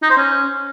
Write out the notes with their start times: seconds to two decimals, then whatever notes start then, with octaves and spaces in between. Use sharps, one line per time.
0.02 D#4
0.10 C5
0.17 C#4